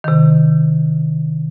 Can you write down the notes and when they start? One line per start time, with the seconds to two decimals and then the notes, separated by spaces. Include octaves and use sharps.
0.04 C3 D#3